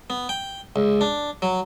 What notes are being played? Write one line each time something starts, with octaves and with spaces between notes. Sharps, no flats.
B3
G5
C#2
D4
F#3